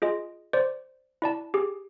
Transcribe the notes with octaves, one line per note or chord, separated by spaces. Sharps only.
F4 G#4 D#5
C5 D5
E4 D5 A5
G4 G#4